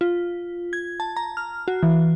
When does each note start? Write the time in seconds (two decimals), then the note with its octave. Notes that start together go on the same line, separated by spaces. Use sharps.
0.01 F4
0.73 G#6
1.00 A5
1.17 A#5
1.37 F6
1.68 F#4
1.83 E3